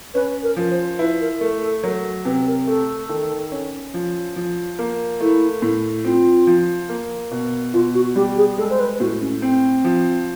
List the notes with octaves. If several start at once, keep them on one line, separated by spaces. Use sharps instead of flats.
C#4 B4
A#4
F3
C5
E4 B4
A#4
A3 A#4
A4
F#3 A#4
C3 B4
A#4
A3 A4
D#3
C#4
F3
F3
A#3
A3 E4
A2
C4 F4
F3
A#3
B2
B2 F4
F#4
G3 G4
G#4
G#3 A4
C5
B4
A2 F#4
C#4
C4
F3